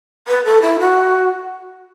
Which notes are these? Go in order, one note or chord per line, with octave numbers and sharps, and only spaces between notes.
B4
A4
E4
F#4